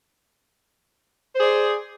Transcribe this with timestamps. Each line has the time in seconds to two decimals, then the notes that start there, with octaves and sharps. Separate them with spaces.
1.35 C5
1.37 G#4
1.40 D5